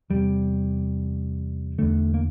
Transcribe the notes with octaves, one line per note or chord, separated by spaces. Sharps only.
E2 C3 G3
E2 D3 A3
A#3